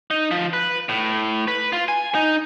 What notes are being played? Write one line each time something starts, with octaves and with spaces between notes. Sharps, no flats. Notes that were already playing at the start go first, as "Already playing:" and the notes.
D#4
F3
B4
A2
B4
F4
G#5
D#4